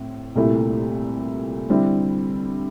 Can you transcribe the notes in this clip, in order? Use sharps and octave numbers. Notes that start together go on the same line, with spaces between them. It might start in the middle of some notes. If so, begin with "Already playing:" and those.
Already playing: A2 C4
C2 A#2 A3 E4
D3 G3 C4 E4